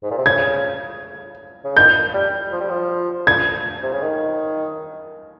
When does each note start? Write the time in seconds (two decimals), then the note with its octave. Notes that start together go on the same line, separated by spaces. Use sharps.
0.03 G#2
0.11 A#2
0.18 C3
0.26 C#3 G#6
1.65 C#3
1.76 D#3 G6
2.14 G3
2.52 F3
2.60 G3
2.70 F3
3.27 G#6
3.83 C3
3.93 C#3
4.02 D#3